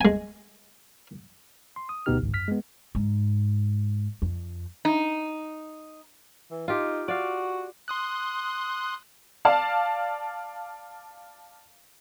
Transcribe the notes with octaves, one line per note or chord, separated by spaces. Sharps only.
G#3 G#5
C6
D#6
D2 B2 B3 D#4 G4 F6
G#1 C#2 G#2
F#2 F6 B6
G#3 B3
G#2
F2
D#4
E3
D#4 F4 G4
F#4 D5 F5
C6 D#6 F#6
D5 F5 A5